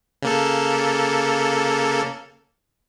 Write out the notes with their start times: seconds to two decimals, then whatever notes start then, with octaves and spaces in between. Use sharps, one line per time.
0.23 C#3 A#3 A4